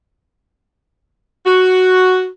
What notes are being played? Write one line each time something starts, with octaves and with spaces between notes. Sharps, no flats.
F#4